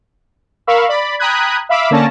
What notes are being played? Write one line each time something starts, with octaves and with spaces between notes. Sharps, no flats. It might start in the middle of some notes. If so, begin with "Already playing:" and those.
A#4 F5 B5 C#6 E6
D5 B5
G5 A#5 B5 D#6 F#6 G#6
E5 F5 B5 D6 E6
D3 A#3 C#4 D5 A5 A#6